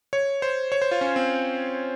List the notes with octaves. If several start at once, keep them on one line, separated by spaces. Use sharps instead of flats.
C#5
C5
C#5
C5
F4
C#4
C4